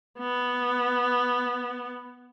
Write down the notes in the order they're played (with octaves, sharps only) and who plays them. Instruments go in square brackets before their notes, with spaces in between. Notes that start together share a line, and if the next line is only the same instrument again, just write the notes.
[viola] B3